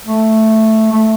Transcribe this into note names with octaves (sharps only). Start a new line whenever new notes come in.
A3
A3